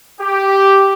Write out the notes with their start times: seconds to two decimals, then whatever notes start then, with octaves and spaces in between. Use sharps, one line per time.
0.21 G4